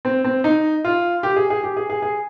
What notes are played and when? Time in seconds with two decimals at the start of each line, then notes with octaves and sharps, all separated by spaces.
0.05 C4
0.24 C4
0.44 D#4
0.85 F4
1.23 G4
1.36 G#4
1.50 G#4
1.64 G4
1.77 G#4
1.90 G#4
2.02 G#4